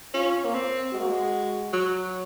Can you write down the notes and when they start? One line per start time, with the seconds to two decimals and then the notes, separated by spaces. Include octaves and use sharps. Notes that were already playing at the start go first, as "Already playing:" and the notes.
0.14 C#4 F4
0.44 A#3
0.54 C4
0.93 G#3 F#4
1.01 A#3
1.08 G#3
1.73 F#3